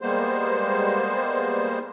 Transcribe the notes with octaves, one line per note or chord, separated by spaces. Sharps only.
G3 G#3 A#3 B3 C5